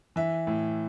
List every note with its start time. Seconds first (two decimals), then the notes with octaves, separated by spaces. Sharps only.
0.16 E3 E5
0.47 A2